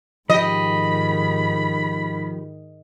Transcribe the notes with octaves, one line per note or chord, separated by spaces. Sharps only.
G#2 D#3 F3 G4 D#5 B5